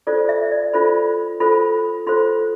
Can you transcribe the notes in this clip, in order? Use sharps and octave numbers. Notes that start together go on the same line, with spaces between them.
F4 A4 C5 D5
E5
D5
F4 A4 C5 B5
F4 A4 C5 B5
F4 A4 C5 C6